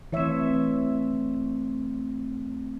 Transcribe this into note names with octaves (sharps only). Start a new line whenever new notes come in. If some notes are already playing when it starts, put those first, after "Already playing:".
E3 A3 C4 C#5 E5